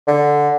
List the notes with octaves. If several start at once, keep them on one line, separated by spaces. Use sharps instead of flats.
D3